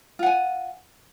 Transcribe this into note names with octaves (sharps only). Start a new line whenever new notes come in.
F4 F#5 G#5